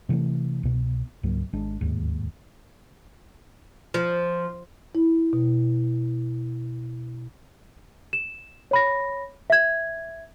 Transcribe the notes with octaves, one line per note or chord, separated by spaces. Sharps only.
C3 E3 G#3 A3
C2 B2
C#2 G#2 F#3 A#3
G#1 G#3 D4
D1 G#1 D#2 G#2
F3
E4
B2
E7
C#5 B5 A#6
E5 G#6